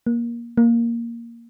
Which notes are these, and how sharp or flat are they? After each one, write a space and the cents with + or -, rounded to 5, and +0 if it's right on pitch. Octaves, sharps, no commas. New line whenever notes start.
A#3 +15
A#3 +0